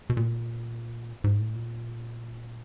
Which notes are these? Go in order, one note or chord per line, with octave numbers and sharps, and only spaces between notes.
B2
A#2
G#2
A2
A#2